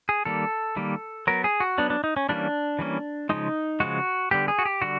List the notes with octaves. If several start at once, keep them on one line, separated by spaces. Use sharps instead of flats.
G#4
D#3 G3 A#3 A4
D#3 G3 A#3
F#3 B3 A#4
G#4
F#4
F#3 B3 D4
D4
D#4
C#4
E3 G3 A#3 C#4 D4
E3 G3 A#3 C#4
C#3 F3 G#3 D#4
C#3 F3 G#3 F#4
D3 G3 B3 G4
G#4
F#4
G4
D3 G3 F#4